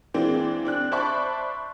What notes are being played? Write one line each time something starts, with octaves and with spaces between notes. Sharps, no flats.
E3 G#3 A#3 C4 D4
C4 D4 F#6
C5 D5 E5 A5 B5 C#6